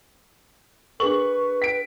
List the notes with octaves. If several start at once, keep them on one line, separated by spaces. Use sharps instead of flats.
D4 G#4 A#4 B4 C#6 F#7
G5 B6 D7